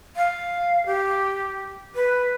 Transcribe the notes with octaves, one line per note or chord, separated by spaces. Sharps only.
F5
G4
B4